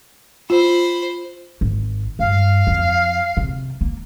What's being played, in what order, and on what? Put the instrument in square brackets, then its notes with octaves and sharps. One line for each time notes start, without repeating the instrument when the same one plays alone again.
[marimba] F4 [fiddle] C5 B5
[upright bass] G#1
[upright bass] G2 [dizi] F5
[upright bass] F2
C3
A#3